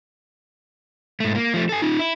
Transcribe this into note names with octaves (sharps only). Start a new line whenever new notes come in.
G#2 A3
A#3
F3 A3
A4 G#5
D#4 F4
E4